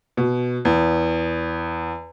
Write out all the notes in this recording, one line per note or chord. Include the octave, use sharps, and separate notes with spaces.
B2
E2